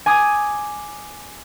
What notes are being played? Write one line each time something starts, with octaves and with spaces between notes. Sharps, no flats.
G#5 D6 D#6